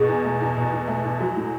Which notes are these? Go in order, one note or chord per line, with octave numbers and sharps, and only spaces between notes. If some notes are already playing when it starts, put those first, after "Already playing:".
Already playing: B2 G#4
E2
A3
E2
B2
E2
A3
E2
F#3 F#4
A2